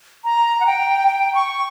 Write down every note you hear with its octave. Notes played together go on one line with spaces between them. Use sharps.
A#5
F#5
G5
G5
C#6